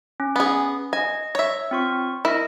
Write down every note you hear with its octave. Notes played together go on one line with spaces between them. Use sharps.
C#4
B3 G#4
D#5 G#5
C#5 E5
C4 F4 C#6
E4 A#4 D#5